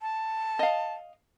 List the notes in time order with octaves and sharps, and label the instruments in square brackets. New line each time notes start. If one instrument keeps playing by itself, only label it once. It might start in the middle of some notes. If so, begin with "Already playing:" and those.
[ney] A5
[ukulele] D#5 F5